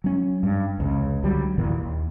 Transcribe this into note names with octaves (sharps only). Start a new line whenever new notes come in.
F#3 C#4
G2
F1 C#2 C#3
C#2 D3 F#3 G3
D#2 A#2 D#3 E3
D#2